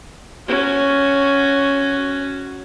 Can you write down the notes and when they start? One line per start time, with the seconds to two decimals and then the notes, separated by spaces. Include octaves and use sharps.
0.48 C#4 F#4